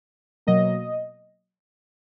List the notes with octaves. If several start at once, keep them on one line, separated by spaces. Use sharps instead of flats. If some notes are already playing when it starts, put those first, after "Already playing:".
B2 F#3 A#3 D#5